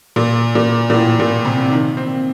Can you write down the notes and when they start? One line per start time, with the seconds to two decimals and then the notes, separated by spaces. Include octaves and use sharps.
0.16 A#2
0.55 A#2
0.90 A#2
0.94 A2
1.20 A#2
1.45 C3
1.71 D#3
1.97 C4